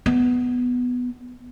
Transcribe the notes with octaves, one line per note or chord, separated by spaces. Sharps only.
B3